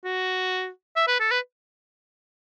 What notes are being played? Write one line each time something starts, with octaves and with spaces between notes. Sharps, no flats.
F#4
E5
B4
A4
B4